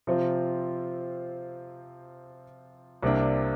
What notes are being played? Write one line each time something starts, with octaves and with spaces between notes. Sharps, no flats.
C3 F3 C4 F4
C2 C3 A#3 D4